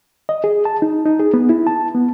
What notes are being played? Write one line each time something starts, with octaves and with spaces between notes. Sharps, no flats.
D#5
G#4
A5
D#4
D#4
G#4
B3
E4
A5
B3